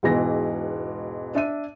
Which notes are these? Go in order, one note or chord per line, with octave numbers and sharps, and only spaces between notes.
E1 G#2 B2 E3 A#6
D4 E5 D#7